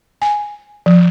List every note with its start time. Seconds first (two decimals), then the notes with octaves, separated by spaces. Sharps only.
0.22 G#5
0.86 F3